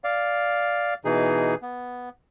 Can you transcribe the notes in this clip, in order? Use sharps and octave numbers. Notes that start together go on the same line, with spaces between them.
D5 F5
B2 E3 D#4 G#4
B3